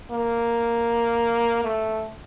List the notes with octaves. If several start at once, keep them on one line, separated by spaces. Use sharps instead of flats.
A#3
A3